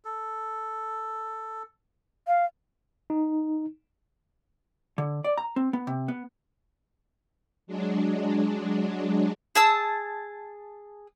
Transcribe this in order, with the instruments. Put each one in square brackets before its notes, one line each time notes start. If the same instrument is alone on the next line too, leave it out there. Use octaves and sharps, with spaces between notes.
[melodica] A4
[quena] F5
[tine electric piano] D#4
[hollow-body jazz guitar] D3
D5
A#5
C4
B3
C3
B3
[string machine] F#3 G#3 D4
[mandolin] G#4 A5 E6